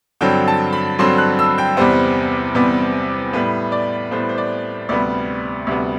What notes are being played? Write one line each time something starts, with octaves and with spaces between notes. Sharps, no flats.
G2 D3 F#3 C4 G5
A5
B5
G2 D3 F#3 C4 C6
F#6
E6
G5
E2 C3 G3 B3 C5
E2 C3 G3 B3
A2 G3 B3 B4
D5
A2 G3 B3 C5
C5
D5
D2 C3 G3 B3 D5
D2 C3 G3 B3